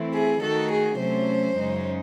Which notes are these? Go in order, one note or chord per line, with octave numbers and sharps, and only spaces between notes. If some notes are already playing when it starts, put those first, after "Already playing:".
Already playing: E3 A3 C4 E4
G#4
D#3 A3 D#4 F#4 A4
G#4
C3 F#3 A3 C#4 C5
F#2 C#3 G#3 D#4